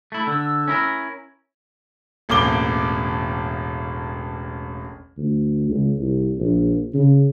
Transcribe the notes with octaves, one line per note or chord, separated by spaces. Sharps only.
A3 E4
D3 E6
C#4 E4 A#4
E1 A1 A#3 D6 G7
D2
C#2
C2
A#1
C#3